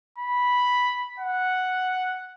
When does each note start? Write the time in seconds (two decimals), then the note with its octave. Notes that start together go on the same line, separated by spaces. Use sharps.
0.18 B5
1.19 F#5